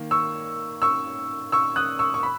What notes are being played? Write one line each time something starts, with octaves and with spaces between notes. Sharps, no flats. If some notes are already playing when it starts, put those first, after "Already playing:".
Already playing: D#3 A#3
C#6 E6
C#6 E6
C#6 E6
D#6 F#6
C#6 E6
C#6
B5